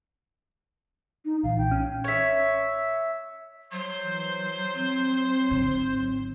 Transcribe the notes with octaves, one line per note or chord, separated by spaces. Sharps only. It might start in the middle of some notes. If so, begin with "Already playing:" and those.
D#4
B1 A#2 E3 F5
G5
C#4 F6
C#5 E5
F#3 C5
E3
C4
G#1 D3